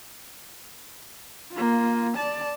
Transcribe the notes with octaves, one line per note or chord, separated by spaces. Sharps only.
A#3 F4
D5 A5